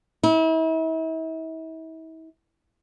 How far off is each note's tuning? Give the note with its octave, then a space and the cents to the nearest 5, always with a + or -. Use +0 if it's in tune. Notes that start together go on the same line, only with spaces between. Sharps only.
E4 -40